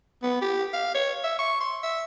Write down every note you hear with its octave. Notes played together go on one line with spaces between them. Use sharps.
B3
G4
F5
C#5
E5
C#6
C6
E5